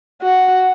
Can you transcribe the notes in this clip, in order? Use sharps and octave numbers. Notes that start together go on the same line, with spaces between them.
F#4